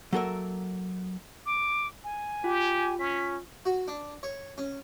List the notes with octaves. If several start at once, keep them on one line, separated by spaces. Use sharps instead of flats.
F#3 A#3 A4 A#4 E5
D6
G#5
F4 G4
C#4 B6
F#4
D4
C#5
C#4